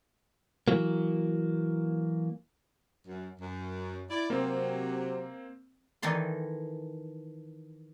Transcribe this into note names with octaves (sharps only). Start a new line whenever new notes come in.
E3 F#3 A#3
F#2
F#2
E4 D5
C3 F#3 A#3 C4
D#3 E3 D#4 A4 C6